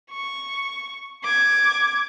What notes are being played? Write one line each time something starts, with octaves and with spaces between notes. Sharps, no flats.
C#6
D6 G#6